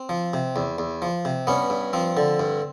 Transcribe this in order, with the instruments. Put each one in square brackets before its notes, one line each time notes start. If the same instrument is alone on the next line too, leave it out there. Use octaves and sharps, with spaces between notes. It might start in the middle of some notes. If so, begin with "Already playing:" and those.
Already playing: [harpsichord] C4
F3
C3
E2
E2
F3
C3
G2 B3 C#4
G2
F3 C4
D3
G2